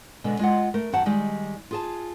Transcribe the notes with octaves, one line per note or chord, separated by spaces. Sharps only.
B2 D3 G#3 B3
G#3 F4 D#5 F#5
A3 A#4
F#2 D#3 F#4 F#5 A5
D#3 G3 G#3
F4 G#4 A5